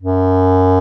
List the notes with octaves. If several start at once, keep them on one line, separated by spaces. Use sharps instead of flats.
F#2